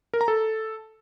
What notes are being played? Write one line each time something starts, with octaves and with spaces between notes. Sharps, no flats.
A#4
A#5
A4